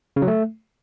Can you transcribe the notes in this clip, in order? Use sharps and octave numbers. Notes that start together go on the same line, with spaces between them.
C#3
F#3
A3